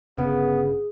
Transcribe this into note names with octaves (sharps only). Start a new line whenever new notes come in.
G1 C#3 B3 G#4